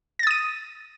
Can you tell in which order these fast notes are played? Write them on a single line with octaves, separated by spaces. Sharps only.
A#6 A6 D#6 D#7